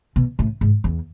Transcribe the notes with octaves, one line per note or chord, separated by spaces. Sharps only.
B2
A2
G#2
E2